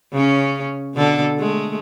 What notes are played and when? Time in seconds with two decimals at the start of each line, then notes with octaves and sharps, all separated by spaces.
0.13 C#3 C#4
0.94 B2 D3 A4
1.39 G#3 A3